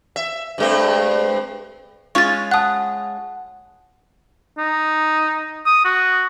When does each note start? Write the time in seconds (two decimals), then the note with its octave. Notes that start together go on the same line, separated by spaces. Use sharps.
0.16 E5
0.58 G2 G#3 C4
2.15 G#3 C#4 F4 C#6 A6
2.51 F#5 A5 D#6 F#6
4.58 D#4
5.66 D#6
5.84 F#4